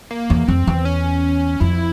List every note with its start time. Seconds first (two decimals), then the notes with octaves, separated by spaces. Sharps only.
0.11 A#3
0.30 E2
0.48 F2 C4
0.67 E2
0.85 C#4
1.60 F2 E4